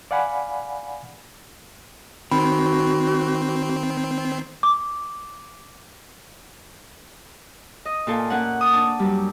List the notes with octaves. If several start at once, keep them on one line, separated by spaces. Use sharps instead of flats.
D5 F5 F#5 G#5 B5
D#3 C4 F#4 B5
D6
D#5
A#2 F4 A4 G#5
A#3 C#4 F#5
D#6
D4 A5
F#2 G3